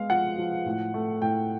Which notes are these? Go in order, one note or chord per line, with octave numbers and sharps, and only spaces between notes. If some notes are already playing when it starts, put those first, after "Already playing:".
Already playing: G#3 B3 F5
F3 F#5
F3
A2
A3
A2 G5